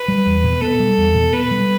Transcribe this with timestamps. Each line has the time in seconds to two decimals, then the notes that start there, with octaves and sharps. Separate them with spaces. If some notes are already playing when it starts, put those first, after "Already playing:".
Already playing: B4
0.08 G3
0.26 E2
0.44 B2
0.61 B3 A4
0.80 G3
0.98 E2
1.15 B2
1.33 B3 B4
1.51 G3